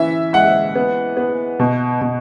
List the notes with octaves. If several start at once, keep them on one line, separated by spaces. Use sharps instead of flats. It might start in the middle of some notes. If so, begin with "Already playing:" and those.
Already playing: E3 C#4 E5
G#3 F#5
B3
B3
B2
B2